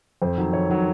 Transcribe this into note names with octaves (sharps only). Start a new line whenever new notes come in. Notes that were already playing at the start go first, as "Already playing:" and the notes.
F2 C5
D#3 F#3
F2 C#5
D#3 F#3